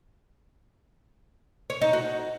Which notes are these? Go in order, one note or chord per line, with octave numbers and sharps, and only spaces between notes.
C#5
D#4
F#4